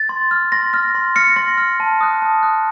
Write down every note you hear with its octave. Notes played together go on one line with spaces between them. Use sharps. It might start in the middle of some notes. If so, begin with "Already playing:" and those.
Already playing: A6
C6
F6
C6 A#6
F6 A#6
C6
F6 A#6 C#7
C6 A#6
F6
A5
D#6 F#6
A5
D#6 F#6